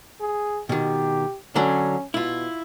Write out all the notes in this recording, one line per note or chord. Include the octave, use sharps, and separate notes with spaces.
G#4
B2 D#3 G4
D3 F#3 C#4 D4
B2 E4 F4